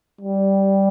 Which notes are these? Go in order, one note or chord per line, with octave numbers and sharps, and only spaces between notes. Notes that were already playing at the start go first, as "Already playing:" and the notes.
G3